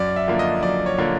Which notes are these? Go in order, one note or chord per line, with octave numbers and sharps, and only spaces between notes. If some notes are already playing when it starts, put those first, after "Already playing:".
Already playing: F#2 D5
E5
D3 F3 A#3
D#5
F#2 D5
C#5
D3 F3 A#3